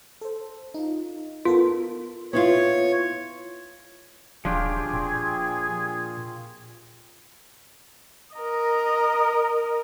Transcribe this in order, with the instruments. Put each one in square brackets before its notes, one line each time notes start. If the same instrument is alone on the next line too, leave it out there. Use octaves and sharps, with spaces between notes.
[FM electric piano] A4 C5
D#4 F4
[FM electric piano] B3 A4 A#4 [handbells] F4
[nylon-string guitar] B3 E4 F4 [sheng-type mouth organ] C#5
[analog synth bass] D#1 [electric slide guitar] F3 D4 G4 [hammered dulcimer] F4 C#5 [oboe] G#4
[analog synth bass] A#2 [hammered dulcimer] C4
[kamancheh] A#4 D#5